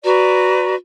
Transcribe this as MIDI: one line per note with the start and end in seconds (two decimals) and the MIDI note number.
0.04 0.75 66
0.04 0.75 71
0.04 0.75 74
0.04 0.75 82